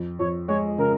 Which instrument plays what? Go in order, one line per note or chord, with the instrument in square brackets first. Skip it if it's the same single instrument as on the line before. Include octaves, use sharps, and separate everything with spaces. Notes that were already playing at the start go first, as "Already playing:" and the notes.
Already playing: [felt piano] F2
[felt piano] F2 [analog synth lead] C#5
[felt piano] G#3 [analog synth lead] C#5
[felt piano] C#3 [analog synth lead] A#4